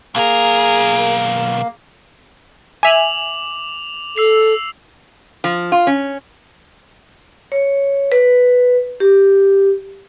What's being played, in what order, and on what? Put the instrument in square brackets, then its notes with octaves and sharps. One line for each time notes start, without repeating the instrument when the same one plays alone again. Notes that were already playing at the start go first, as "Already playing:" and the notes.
[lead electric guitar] B1 A#4 [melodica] A#3 [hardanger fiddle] G#4
[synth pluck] E5 G#5 [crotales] D6 F7 F#7
[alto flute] A4 [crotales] E6 C7 F7
[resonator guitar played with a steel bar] F3
F4
C#4
[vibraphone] C#5
B4
G4